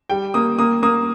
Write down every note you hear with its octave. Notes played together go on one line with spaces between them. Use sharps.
G3 G5
A#3 D#6
A#3 D#6
A#3 D#6